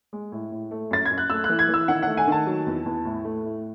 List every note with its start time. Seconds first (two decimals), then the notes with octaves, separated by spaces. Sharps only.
0.13 G#3
0.32 A2
0.51 A2
0.71 A3
0.91 F#2 A6
1.05 G#6
1.11 F#2
1.18 F#6
1.30 A3 E6
1.44 F#6
1.49 E3
1.59 G#6
1.69 E3
1.74 E6
1.88 D#3 F#5
2.02 A3 F#5
2.17 G#5
2.27 D#3 A5
2.47 F#3
2.67 E2
2.86 E2
3.05 A2
3.25 A3
3.44 A2